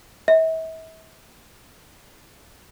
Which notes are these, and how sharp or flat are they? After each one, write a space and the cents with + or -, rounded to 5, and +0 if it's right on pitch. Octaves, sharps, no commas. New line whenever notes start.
E5 -40